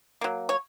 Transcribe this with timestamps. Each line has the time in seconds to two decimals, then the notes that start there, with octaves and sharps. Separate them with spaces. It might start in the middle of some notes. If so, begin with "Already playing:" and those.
0.21 F#3 A#3
0.49 C#5